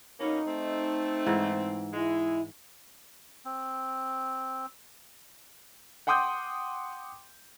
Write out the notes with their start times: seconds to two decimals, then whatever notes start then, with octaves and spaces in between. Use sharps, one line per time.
0.20 B2 A#3 C#4 D#4
0.47 A3 C4
1.26 G#2 E3
1.94 G#3 E4
3.45 C4
6.07 F#5 G5 C6 D6 D#6 G6